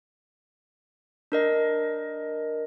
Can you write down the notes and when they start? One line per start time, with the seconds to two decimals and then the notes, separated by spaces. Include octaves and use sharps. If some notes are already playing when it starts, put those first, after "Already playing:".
1.32 D4 A#4 D#5